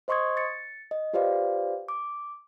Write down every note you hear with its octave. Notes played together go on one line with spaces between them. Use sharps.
C5 D#5 C6 C#6 D#6 G#6
A6 C#7
D#5
F4 G4 B4 C5 D5 F5
D6